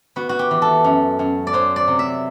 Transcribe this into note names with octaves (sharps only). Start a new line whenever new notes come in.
B3 F#4
F#4
G4
E3
A4
F#2
F#2
D5
F#3 C5
D5
C3
E5